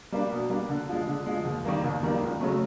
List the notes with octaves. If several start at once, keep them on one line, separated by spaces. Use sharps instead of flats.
G3 A#3 D4
B2
G3 A#3 D4
D3
F3 G#3
D3
F3 G#3
D#2
D#3 G3 A#3
D#2
D#3 G3 A#3
C#2
C#3 F#3 A3